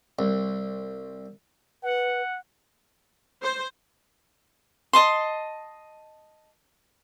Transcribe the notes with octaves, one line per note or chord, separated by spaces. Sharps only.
C2
B4 F#5
C5
D#5 A5 C6